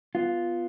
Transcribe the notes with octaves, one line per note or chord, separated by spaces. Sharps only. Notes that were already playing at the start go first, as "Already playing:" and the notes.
B3 F4